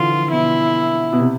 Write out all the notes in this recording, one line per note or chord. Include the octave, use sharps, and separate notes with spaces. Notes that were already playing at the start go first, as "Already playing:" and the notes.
Already playing: D3 E3 F4
F3
B2 E4
B2
C3